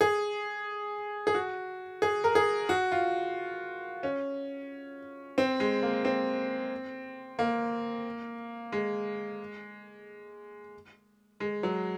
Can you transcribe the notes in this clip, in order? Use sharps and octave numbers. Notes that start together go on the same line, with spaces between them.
G#4
G#4
F#4
G#4
A#4
G#4
F#4
F4
C#4
C4
G#3
A#3
C4
A#3
G#3
G#3
F#3